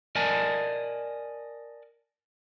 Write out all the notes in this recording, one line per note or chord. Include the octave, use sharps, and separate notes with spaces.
A#4 D5 D#5 G#5 A5